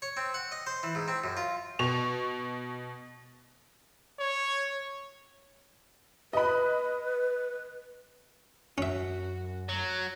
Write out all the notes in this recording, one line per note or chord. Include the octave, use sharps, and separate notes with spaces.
C#5
C4
F#5
D#5
C5
E3
G#2
C4
F#2
F4
B2 C#6 F7
C#5
B4 D#5 B5
F#2 C#4 F#4 E5
F#3 A#5